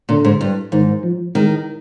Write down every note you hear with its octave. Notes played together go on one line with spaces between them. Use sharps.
A#2 D3
G#2
G2
G#2 D#3
F3
D#3 G#3